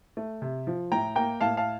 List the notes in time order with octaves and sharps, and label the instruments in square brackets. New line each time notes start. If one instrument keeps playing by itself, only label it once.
[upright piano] A3
C3
F3
A2 G5 A#5
A#3 G5 A#5
A2 F5 A5
F5 A5